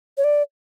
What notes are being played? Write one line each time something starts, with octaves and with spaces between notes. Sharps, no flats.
C#5
D5